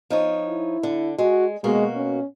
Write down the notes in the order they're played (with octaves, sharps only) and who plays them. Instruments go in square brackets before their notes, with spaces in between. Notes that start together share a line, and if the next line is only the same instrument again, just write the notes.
[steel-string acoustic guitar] F3 D#4 C#5
[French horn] E4
[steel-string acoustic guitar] D3
[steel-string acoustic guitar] G#3 [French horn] F#4
[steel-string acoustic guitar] B2 A#3 F#4 [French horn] G#3
[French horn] C#4